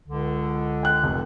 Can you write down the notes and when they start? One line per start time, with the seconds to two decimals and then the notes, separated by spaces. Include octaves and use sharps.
0.07 C#2 D3
0.83 G5 F#6
1.03 F1